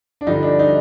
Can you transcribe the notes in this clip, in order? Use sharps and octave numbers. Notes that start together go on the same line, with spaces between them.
D4
G2 D3 F3 D#4
D4
D#4